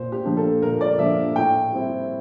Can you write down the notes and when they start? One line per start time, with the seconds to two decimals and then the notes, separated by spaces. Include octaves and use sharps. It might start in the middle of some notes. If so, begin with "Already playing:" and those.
Already playing: A#2 C5
0.12 G4
0.25 F3 A#3 D4
0.37 A4
0.62 A#2 A#4
0.81 D5
0.99 F3 A#3 D4 E5
1.36 A2 G5
1.72 G3 C4 E4